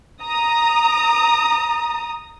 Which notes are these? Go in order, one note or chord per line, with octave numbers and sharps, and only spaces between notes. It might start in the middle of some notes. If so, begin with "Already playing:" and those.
A#5 D#6